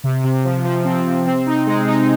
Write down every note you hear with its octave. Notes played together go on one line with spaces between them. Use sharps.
C3
C3
F3
F3
C4
C3
C4
D#4
G#3
D#4